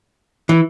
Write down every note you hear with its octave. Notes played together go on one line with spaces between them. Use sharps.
E3